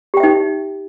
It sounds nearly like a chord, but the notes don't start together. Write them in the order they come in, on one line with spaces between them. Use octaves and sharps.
G4 G5 E5 D#4